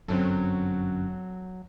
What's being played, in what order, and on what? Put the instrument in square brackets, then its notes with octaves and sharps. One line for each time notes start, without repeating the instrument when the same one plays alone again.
[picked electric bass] G1 F#2 [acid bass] F#3 [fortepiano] C4 A4